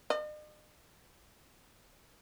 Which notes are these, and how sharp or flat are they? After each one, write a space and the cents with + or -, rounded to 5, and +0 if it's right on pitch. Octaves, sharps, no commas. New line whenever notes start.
D#5 -45